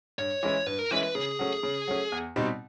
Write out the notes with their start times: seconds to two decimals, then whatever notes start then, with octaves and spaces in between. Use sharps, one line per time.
0.19 G2 C#5
0.43 E3 G#3 C#4 E4
0.66 G2 B4
0.79 A#4
0.91 E3 G#3 C#4 E4 B4
1.03 B4
1.15 C#3 G#4
1.39 F#3 A3 C#4
1.63 C#3
1.87 F#3 A3 C#4
2.12 E2
2.36 B2 G3 C4 D#4